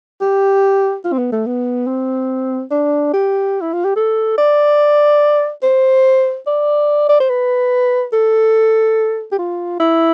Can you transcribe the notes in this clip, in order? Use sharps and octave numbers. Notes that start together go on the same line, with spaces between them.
G4
F4
C4
B3
A3
B3
C4
D4
G4
E4
F4
G4
A4
D5
C5
D5
D5
C5
B4
A4
G4
F4
E4